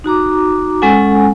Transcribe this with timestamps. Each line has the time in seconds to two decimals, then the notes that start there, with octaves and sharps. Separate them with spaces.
0.04 D#4 F#4 A#5 D6
0.82 G#3 C#4 A4 F#5 G#5